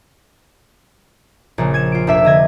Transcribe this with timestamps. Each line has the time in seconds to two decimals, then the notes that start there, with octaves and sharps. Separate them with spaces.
1.58 A#1 C#3 A#3
1.74 G#6 D#7 E7
1.92 F4 D7
2.07 F1 D4 E5 E6 B6 E7
2.25 D3 D#5 G#6